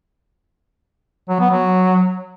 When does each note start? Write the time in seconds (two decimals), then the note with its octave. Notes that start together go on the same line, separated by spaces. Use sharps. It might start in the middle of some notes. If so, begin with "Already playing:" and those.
1.29 F#3
1.40 B3
1.51 F#3